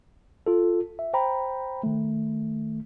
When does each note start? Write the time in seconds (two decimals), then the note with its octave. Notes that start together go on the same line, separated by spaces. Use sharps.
0.46 F4 A4
0.99 E5
1.14 C5 G5 A#5 B5
1.83 D#3 A3